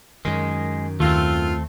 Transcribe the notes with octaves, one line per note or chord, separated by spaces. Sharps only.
F#2 D#3 G#3
D#2 A3 C4 F4